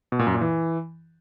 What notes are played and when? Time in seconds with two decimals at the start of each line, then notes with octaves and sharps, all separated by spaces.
0.12 B2
0.19 A#2
0.27 F#2
0.34 A#2
0.41 E3